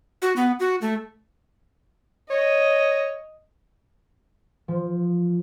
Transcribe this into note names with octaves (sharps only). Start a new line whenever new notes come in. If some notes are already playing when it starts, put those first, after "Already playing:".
F#4
B3
F#4
A3
C#5 D#5
F3